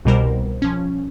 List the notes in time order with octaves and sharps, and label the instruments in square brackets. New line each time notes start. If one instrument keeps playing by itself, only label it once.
[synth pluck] C2 B2 G3 A#4 C5
F3 C#4